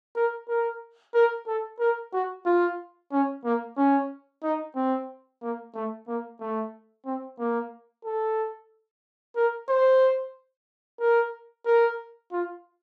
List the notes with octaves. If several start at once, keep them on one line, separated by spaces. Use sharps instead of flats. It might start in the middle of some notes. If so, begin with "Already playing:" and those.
A#4
A#4
A#4
A4
A#4
F#4
F4
C#4
A#3
C#4
D#4
C4
A#3
A3
A#3
A3
C4
A#3
A4
A#4
C5
A#4
A#4
F4